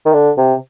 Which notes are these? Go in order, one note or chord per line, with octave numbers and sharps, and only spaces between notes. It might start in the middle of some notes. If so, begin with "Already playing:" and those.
D#3
D3
C3